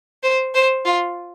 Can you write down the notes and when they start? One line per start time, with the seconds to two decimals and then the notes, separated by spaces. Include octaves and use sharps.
0.23 C5
0.54 C5
0.85 F4